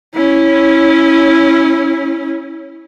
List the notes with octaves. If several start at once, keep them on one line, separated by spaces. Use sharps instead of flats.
C#4 E4